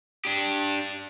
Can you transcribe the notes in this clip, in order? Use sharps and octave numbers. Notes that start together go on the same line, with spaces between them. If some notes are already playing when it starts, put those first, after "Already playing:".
D4 G4